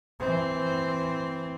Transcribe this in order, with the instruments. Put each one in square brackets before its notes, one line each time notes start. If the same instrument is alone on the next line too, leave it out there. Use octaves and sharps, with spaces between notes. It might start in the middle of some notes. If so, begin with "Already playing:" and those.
[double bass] E3 C4